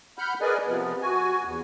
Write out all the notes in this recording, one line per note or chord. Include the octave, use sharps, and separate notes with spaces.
F#5 B5 F6 G6
G#4 A#4 B4 D5 D#5 G#5
C3 F3 B3
F#4 G#5
E2